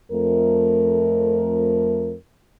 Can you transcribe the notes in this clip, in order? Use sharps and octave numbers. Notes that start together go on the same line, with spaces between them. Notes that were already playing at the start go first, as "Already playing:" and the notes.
F2 A3 A#4